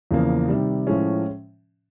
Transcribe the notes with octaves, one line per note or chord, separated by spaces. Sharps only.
E2 C#3 F3 A#3
C3 D#3 G3
A2 F3 G#3 C#4